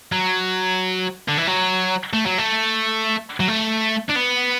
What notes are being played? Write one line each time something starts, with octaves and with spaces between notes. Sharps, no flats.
F#3
D3
E3
F#3
A3
F#3
A3
F#3
A3
D4
B3